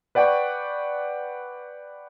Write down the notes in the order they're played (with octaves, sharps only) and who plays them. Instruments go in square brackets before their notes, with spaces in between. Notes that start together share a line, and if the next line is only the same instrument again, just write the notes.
[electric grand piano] B4 D5 F#5 G5 C#6